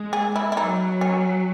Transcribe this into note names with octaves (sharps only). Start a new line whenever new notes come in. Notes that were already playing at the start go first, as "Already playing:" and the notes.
Already playing: G#3
G#4
E4
E4
F#3 D#4
C#4